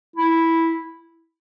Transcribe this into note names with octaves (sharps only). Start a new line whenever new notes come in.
E4